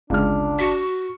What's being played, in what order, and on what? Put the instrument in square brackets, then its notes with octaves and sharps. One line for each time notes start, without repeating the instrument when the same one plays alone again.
[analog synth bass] G1 [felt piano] C#2 F6 [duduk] D4
[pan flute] F#4 [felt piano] B6 C#7